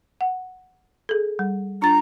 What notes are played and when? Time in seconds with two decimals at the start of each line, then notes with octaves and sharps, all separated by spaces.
0.21 F#5
1.09 G#4 A4
1.39 G3
1.82 D4 F4 A#5 A6